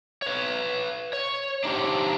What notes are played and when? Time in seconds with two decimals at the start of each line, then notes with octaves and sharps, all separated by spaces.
0.22 B4 C#5
1.13 C#5
1.64 D4 D#4 G4 C5